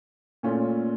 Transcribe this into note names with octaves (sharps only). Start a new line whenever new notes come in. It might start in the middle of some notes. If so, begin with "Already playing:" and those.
A#2 A3 C#4 F4